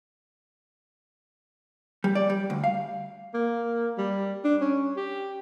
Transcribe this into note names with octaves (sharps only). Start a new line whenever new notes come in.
G3
D5
G3
D2
F5
A#3
G3
D4
C#4
G4